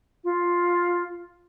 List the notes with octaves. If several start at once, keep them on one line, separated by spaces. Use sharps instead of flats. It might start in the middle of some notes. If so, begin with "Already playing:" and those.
F4